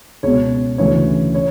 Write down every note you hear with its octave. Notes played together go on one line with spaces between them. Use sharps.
C#2 B2 C#5
D2 C#3 E3 C#5
C#5